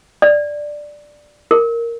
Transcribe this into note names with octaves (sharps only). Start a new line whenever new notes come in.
D5
A#4